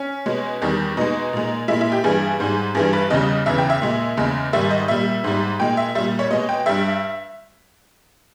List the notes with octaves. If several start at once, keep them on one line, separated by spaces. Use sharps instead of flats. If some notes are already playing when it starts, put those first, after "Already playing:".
Already playing: C#4
B2 G#3
E2 D#3 G3
B2 G#3 D#4
A#2 G#3
A#2 G#3 E4
E4
G4
G2 E3 G3 G#4
G#2 G3
G2 E3 G3 G#4
B4
E2 C#3 G3 D#5
E2 C#3 E3 E5
G5
E5
A#2 G#3
E2 C#3 G#3
G#2 D#3 G3 E5
D#5
A#2 G3 E5
G#2 G3
A#2 G#3 G5
E5
A#2 G3 E5
C#5
B2 G#3 D#5
G5
G2 G3 E5